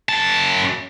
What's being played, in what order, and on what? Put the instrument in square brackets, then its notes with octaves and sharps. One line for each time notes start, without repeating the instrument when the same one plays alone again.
[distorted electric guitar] F#2 A5